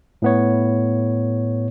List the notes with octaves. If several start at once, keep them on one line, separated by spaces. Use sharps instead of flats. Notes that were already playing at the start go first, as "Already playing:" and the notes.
A2 B3 C#5